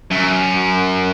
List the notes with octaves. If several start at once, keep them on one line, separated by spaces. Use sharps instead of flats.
F#2